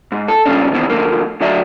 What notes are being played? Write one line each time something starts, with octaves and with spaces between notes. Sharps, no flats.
G#2
A4
G2 A#2 C#3 C#4 D4
E2 B2 D#3 E3 C4
F2 D3 A3 A#3
D2 D3 F#3 D5 E5